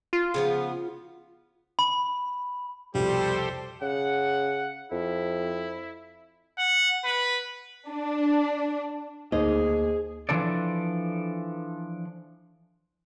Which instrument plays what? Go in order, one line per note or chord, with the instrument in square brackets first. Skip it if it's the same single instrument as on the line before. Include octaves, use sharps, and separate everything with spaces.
[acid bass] F4
[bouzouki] C#3 F3 B3
[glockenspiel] B5
[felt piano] C2 F2 B2 [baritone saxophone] G3 [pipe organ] G4 A4 C5
[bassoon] C#3 [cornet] F#5
[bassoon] F2 [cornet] E4
[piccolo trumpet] F#5
B4
[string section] D4
[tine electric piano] D2 A#3 [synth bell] D#4 [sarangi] G#4 [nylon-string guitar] C5 D#5
[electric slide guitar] E3 F3 D4 A4 D5